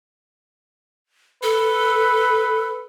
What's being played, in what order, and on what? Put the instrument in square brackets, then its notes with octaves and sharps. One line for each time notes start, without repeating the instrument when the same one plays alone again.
[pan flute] A4 [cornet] B4